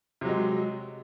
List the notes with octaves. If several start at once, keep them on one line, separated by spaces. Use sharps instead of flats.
C3 F#3 G#3